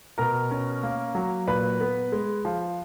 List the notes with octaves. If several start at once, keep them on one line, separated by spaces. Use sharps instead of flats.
B2 A#4 A#5
C#4
A#3
F#3
A#2 B4 B5
B3
G#3
F3